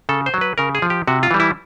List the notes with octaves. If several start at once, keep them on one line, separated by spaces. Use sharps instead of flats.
C#3 A4
C5
F#3
B4
C#3 A#4
G#4
F3
G4
C3 F#4
F4
E3 G3
E4